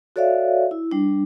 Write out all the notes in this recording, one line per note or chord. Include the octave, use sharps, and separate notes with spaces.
F#4 A4 C#5 D5 E5 F5
E4
G3 D4